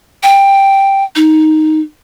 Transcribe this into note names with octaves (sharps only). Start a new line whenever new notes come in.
G5
D#4